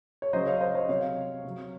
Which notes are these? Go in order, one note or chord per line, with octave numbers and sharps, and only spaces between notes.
C#5
C#3 F#3 C5 D#5
C#5 F5
C5 D#5
C5 D#5
C3 F#3 C#5 F5
C3 F#3